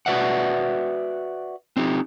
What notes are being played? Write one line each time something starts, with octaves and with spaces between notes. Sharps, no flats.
F#4 B4 D5 E5 F#5
C4 D#4 G4